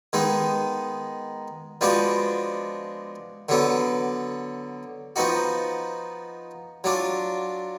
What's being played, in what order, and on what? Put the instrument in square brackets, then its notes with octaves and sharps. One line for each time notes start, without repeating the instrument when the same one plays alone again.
[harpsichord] D#3 G#3 B3 D#4
F3 G#3 B3 D4 F#4
D3 F#3 B3
F3 B3 D#4 F#4
F#3 D4 F4